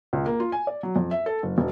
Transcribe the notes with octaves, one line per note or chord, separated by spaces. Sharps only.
C#2
A#3
F4
G#5
D5
F#3
F2
E5
A4
F#1
E1